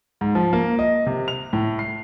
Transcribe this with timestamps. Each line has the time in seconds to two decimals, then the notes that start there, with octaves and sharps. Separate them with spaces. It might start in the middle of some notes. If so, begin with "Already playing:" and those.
0.21 G#2
0.35 F3
0.53 A#3
0.79 D#5
1.06 C3
1.28 F7
1.53 A2
1.79 C7